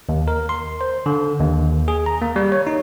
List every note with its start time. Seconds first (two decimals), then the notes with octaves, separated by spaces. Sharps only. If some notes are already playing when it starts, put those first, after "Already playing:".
0.09 D#2
0.28 A#4
0.49 C6
0.81 C5
1.06 D3
1.39 D#2
1.88 G#4
2.06 A#5
2.22 A#3
2.36 G3
2.52 C#5
2.67 D#4